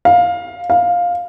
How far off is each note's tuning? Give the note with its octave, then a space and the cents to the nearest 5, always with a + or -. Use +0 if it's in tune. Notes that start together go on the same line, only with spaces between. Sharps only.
F5 +15
F5 +10